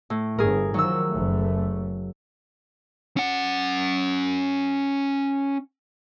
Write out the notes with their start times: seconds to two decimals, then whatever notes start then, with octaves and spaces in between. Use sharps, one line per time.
0.10 A2
0.38 G1 G2 G#4 A#4
0.74 D#3 F3 F#3 E6
1.11 F#1 A3
3.17 C#4 F#5